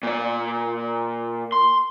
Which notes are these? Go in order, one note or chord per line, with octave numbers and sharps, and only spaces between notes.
A#2 D5
C6